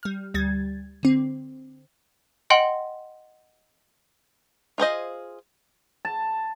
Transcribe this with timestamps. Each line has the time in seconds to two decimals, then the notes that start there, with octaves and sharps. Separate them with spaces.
0.03 G3 F6
0.34 D2 G3 G#6 A6
1.03 D3 C4
2.50 D#5 F#5 G5 C6 F#7
4.78 F4 G#4 C5 D#5
6.05 A5